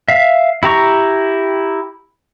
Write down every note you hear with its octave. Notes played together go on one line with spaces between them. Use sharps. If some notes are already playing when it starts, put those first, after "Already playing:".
E5 F5
E4 G4 A#5 C#6